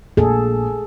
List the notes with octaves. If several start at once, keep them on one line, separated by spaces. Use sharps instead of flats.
A#1 G#4 A4